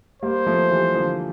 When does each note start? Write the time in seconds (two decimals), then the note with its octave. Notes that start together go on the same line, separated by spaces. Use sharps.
0.22 G3 A#3 C5
0.47 F3 A3
0.70 E3 G3
0.95 D3 F3